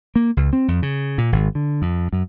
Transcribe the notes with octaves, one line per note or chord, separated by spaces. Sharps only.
A#3
C#2
C4
F2
C#3
A#2
G#1
D3
F2
F#2